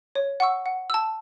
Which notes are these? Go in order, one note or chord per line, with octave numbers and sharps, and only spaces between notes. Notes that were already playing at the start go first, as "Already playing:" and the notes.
C#5
F#5 C#6 E6
F#5
A5 E6